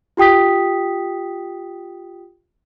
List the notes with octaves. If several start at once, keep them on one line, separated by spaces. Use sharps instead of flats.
F4 G4 G5 D#6 B6